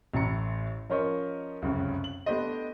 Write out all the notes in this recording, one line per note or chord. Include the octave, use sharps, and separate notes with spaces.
A1 A2 E4 A#5 C#7
F3 C#4 A#4 C5 C#5 D#5
F1 C#2 F#2 C#3
F#7
A3 B3 D4 G4 C5 D#5